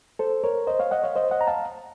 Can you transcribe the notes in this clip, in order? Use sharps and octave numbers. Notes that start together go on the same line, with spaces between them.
A4 C5
A#4 C#5
C5 D#5
C#5 F5
D#5 F#5
C#5 F5
C5 D#5
D#5 F#5
A#5
F5 A5